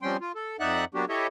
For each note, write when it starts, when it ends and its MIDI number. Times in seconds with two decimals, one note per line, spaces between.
0.02 0.17 53
0.02 0.17 55
0.02 0.17 60
0.02 0.17 61
0.02 0.17 79
0.02 0.17 84
0.21 0.32 65
0.35 0.57 69
0.60 0.85 41
0.60 0.85 63
0.60 0.85 74
0.60 0.85 76
0.60 0.85 78
0.60 0.85 90
0.94 1.05 54
0.94 1.05 58
0.94 1.05 59
0.94 1.05 62
0.94 1.05 66
0.94 1.05 67
1.09 1.27 64
1.09 1.27 67
1.09 1.27 69
1.09 1.27 73
1.09 1.27 75
1.09 1.27 76